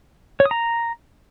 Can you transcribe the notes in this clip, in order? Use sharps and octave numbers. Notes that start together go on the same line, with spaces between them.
C#5
D#6
A#5